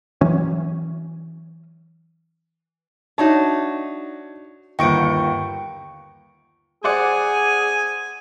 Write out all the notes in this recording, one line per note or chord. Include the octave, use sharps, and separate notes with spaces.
E3 F#3 C#4
D4 D#4 F#4 C#5 E5 A5
G1 D#2 D#5 F#5 G5 C#6 D7
G#4 C5 D5 F#5 G#5